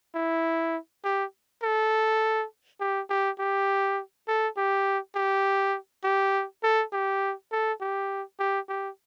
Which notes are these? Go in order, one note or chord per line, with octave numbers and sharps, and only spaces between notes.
E4
G4
A4
G4
G4
G4
A4
G4
G4
G4
A4
G4
A4
G4
G4
G4